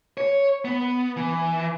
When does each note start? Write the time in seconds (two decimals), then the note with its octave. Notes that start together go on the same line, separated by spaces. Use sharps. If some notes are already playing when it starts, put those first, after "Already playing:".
0.18 C#5
0.65 B3
1.16 E3